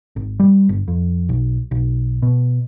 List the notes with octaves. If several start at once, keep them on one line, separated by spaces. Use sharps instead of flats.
G#1
G3
G1
F2
B1
B1
B2